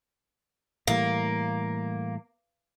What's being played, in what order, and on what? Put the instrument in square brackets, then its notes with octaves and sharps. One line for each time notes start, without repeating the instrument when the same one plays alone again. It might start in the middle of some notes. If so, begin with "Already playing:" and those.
[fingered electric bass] A2 E3 G3 [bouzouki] A#3